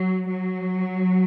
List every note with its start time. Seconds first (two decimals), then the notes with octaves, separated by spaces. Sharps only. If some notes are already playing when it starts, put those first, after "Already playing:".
Already playing: F#3
0.30 F#3